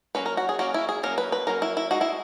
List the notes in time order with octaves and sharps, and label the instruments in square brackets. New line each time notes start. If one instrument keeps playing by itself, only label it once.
[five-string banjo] F#3 A#3 C#4 B4
A#4
F#4
G#4
F#3 A#3 C#4 F#4
E4
G#4
F#3 A#3 C#4 A#4
B4
B4
F#3 A#3 C#4 A#4
E4
E4
G#3 D#4 F#4
E4